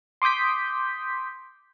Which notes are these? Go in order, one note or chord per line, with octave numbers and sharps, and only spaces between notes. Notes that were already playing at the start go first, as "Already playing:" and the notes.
C6 D6 D#6 G6 B6